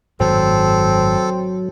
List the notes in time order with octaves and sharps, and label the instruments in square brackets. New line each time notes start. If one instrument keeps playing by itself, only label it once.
[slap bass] G#1 F#2 A2 [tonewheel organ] F#3 [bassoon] C4 [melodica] A4